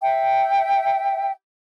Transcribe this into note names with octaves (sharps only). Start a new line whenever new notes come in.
E5 G5